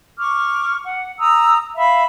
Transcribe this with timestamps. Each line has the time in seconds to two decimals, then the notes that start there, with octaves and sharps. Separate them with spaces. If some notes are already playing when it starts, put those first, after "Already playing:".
0.18 C#6 D6 F6
0.84 F#5
1.19 A#5 D#6 E6
1.75 E5 F5 B5